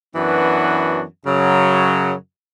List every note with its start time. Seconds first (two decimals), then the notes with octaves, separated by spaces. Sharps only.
0.13 F#2 E3 B3 D4 F#4
1.24 F#2 C#3 F#3